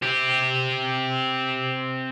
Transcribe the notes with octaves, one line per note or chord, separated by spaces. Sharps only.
C4 G4